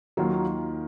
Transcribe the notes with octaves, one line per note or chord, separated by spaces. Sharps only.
D#2 D#3 F#3 A#3 F4 A#4